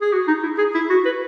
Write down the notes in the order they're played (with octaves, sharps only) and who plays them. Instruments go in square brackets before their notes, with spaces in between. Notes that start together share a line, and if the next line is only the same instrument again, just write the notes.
[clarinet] G#4
F#4
D#4
E4
G#4
E4
F#4
B4